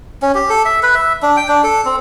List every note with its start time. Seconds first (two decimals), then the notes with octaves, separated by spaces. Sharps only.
0.22 C#4
0.35 G4
0.50 A4
0.65 E5
0.83 B4
0.95 E5
1.23 D4
1.37 G5
1.48 D4
1.64 A4
1.85 C4